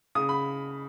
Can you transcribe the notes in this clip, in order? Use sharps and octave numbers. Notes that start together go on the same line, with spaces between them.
C#3 D#6
B5